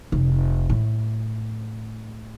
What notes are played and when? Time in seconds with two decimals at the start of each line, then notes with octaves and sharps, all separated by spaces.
0.12 F1
0.70 A2